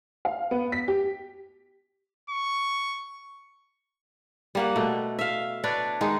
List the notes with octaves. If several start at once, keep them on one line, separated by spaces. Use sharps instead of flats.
F5
B3
B6
G4
C#6
G3 A#3 F#5
B2 A3
E5 F5
D4 B4 C#5 D5
D#3 G#3 D#4